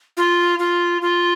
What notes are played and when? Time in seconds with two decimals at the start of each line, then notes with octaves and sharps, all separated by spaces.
0.17 F4
0.59 F4
1.02 F4